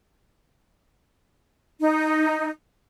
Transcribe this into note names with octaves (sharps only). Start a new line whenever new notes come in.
D#4